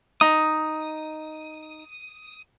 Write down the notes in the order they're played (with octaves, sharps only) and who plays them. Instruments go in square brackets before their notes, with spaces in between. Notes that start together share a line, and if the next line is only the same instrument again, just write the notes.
[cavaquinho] D#4 [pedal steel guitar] D#6